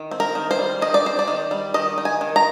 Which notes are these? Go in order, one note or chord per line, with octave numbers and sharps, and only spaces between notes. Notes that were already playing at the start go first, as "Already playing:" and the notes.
Already playing: D#3
C4
A#4
D#3
C5
G3
D#3 D#5
D5
C4 C5
D5
D#3
G3
D#3 D#5
D#4
G#5
D#3
A#5